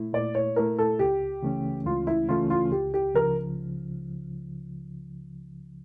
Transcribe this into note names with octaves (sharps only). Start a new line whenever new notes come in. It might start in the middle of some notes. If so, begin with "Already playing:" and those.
Already playing: A#2 A3 E4
A#2 D5
C#5
A3 E4 A#4
A4
C#2 G4
C#3 E3 A3 C#4
C#2 F4
E4
C#3 E3 A3 C#4 F4
F4
C#2 G4
G4
C#3 F3 A#4